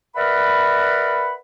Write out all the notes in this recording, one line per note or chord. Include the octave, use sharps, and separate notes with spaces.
A#4 B4 D5 E5 F#5 B5